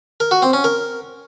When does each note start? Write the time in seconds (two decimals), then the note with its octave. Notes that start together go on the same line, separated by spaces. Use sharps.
0.20 A#4
0.31 F#4
0.42 C4
0.53 C#4
0.64 A#4